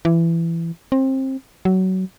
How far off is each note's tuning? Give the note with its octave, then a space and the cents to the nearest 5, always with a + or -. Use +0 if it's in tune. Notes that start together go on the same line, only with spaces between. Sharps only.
E3 +20
C4 +25
F#3 +20